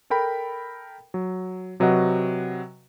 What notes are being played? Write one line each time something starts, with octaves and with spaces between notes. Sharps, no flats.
A4 A#4 G5 B5
F#3
C3 F#3 F#4 B4 D#5 F#5